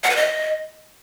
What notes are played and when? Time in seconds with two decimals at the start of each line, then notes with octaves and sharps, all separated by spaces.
0.04 F#5
0.10 B4
0.16 D#5